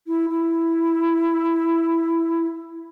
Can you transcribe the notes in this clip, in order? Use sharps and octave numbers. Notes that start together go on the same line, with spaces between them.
E4
E4